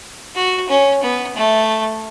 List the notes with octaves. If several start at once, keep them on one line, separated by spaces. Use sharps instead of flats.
F#4
C#4
B3
A3